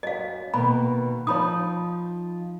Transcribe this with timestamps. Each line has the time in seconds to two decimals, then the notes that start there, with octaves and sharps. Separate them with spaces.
0.03 F#2 D#5 F5
0.54 B2 D#3 A#3 B5
1.27 F3 D#4 C#5 B5 D#6